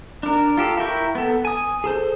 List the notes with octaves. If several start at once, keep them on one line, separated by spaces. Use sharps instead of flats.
D4 A#4
F4 G4 A4
E4 A#4 G5 C#6
B3 A4
G#5 D#6
G#4 A4 C5